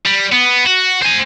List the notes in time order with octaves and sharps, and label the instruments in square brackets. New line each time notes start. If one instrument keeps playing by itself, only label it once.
[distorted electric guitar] G3
B3
F#4
C5 G#5